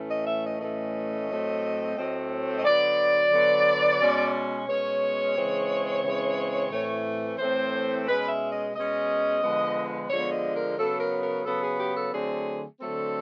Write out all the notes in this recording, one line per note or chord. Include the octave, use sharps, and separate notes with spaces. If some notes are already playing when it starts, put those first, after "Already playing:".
Already playing: A2 E3 A3 C#4
D#5
E5
D#5
A2 E3 A3 C#4 D#5
A2 F#3 A3 C4
A2 F#3 A3 C4
D#5
D3 F#3 B3 D5
D3 F#3 B3
B2 G#3 C#4
B2 G#3 C#4 C#5
C#3 E3 G#3 C4
C#3 E3 G#3 C4
A2 E3 A3 C4
A2 E3 A3 C4 C5
B2 G#3 C#4 B4
E5
D#5
B2 G#3 C#4 D#5
D3 F3 G#3 B3
D3 F3 G#3 B3 C#5
D#5
A#4
C#3 F#3 B3 A4
A#4
A#4
C#3 F#3 B3 A4
G#4
G4
A4
D3 F#3 A3 C4 G#4
D3 F#3 A3 C4 A4